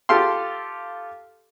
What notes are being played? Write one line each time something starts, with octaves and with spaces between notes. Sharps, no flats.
F4 G4 A4 F5 C6